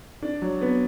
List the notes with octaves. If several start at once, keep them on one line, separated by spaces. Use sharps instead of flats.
D4
F#3
B3